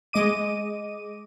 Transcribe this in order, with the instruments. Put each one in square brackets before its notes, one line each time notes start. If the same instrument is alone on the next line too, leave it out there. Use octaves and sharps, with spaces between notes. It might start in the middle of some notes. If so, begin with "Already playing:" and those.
[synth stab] G#3 D#5 D6 D#7